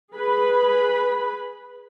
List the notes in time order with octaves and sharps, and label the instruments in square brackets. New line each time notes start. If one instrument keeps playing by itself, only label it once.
[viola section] G#4 B4 B5